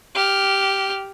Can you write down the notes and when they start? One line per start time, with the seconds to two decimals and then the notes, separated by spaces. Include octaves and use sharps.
0.15 G4 F6